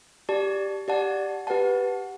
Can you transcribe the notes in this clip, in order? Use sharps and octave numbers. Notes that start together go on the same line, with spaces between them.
G4 D5 A5
G4 D5 F#5 A5
G4 B4 F#5 A5